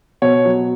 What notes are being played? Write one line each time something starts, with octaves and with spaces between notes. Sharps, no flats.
B2 C#5
F#3